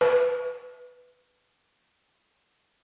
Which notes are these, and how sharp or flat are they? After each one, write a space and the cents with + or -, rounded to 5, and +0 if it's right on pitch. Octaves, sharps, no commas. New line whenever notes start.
B4 +5